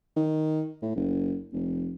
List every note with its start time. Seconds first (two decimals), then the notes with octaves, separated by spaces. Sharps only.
0.16 D#3
0.82 A2
0.96 F#1
1.53 F1